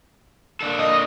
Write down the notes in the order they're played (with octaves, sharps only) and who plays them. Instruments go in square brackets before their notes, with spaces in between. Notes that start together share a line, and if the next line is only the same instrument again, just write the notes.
[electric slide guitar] A#3 D4 A4
[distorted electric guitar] D#5